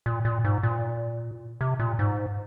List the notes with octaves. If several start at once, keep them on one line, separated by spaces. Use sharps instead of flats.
A#2
A#2
G#2
A#2
C3
A#2
G#2